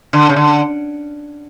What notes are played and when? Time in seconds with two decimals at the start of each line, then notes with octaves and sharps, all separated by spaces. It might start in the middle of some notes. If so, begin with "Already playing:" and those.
0.13 D3
0.29 C#3
0.36 D3